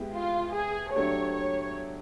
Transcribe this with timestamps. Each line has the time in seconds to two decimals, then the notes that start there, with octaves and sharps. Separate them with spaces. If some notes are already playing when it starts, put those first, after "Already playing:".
Already playing: G#3 B3 E4 G4
0.14 F4
0.54 G#4
0.94 F#3 A3 D4 G4 C#5
1.34 C#5